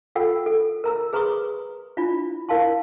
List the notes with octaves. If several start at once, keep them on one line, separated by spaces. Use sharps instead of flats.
F4 A4 F#5 G5 E6
A4
A#4 A#5 E6
G#4 B4 A#5 C6 C#6 D#6
D4 E4 F4
E4 A#4 F5 A5 C6